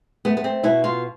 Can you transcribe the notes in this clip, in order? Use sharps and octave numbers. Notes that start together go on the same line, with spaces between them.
A3 B3
B3
C4
B2 E4
F4